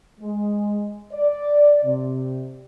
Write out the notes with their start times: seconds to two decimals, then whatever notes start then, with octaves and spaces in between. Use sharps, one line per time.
0.20 G#3
1.12 D5
1.84 C3